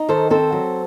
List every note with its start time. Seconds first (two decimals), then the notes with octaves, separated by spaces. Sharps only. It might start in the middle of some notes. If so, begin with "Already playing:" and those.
Already playing: D#4
0.09 D#3 A4 C5
0.30 C4 A4 C5
0.52 F#3